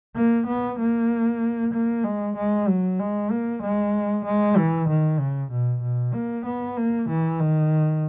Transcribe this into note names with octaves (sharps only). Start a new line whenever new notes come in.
A#3
B3
A#3
A#3
G#3
G#3
F#3
G#3
A#3
G#3
G#3
E3
D#3
C#3
B2
B2
A#3
B3
A#3
E3
D#3